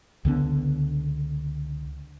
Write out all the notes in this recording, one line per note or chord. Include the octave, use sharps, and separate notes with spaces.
C#2 D3 B3 D4